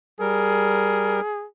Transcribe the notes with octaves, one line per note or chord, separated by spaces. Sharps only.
G3 G#4 A#4